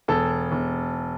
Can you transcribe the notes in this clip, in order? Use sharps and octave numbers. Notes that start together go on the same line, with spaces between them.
E1 A4
E1